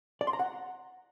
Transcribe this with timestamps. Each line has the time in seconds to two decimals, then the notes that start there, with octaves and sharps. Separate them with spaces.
0.21 D5
0.27 C6
0.33 A#5
0.39 F#5